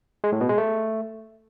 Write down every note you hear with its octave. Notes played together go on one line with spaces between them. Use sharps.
G#3
A2
B2
G#3
A3